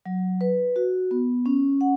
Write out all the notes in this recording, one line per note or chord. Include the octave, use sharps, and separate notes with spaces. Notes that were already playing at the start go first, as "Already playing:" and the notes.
F#3
B4
F#4
B3
C#4
F#5